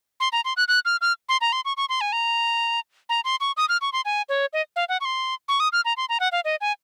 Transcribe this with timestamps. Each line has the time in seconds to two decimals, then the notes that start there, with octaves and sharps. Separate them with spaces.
0.20 C6
0.32 A#5
0.45 C6
0.57 F#6
0.68 F#6
0.85 F6
1.01 F6
1.29 C6
1.41 A#5
1.52 C6
1.65 C#6
1.77 C#6
1.89 C6
2.01 G#5
2.13 A#5
3.09 A#5
3.25 C6
3.41 C#6
3.57 D#6
3.69 F6
3.81 C#6
3.93 C6
4.05 G#5
4.29 C#5
4.53 D#5
4.76 F5
4.89 F#5
5.01 C#6
5.05 C6
5.48 C#6
5.60 D#6
5.73 F6
5.85 A#5
5.97 C6
6.09 A#5
6.20 F#5
6.32 F5
6.45 D#5
6.61 G#5